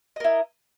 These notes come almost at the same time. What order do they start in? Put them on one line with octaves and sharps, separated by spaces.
D#5 A#4 E4